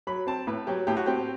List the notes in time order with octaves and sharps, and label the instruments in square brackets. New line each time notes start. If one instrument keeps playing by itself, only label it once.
[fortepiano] F#3 B5
C4 A5
A2 B4
F#3 G4
A2 G4
F#4
C4 G4